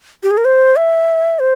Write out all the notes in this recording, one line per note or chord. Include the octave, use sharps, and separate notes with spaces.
G4
G#4
A#4
C5
E5
C5